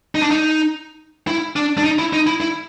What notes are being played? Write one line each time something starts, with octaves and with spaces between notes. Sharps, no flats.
D#4
D4
D#4
E4
D4
D4
D#4
E4
D#4
E4
E4